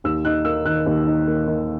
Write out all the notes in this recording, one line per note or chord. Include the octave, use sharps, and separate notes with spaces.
D#2 E6
D#4 F#6
A#3 E6
D#3 F#6
D#2
D#4
A#3
D#3